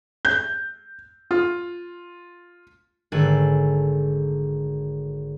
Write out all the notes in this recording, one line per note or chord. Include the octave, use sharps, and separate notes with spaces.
G6
F4
G#1 D3 A3 G#4 F#6 A6